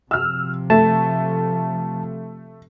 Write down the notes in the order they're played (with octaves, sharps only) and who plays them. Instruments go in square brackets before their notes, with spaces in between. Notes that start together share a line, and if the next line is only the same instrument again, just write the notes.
[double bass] C3 F3 [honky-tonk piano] E6 F6
[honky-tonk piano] A3 [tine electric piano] A5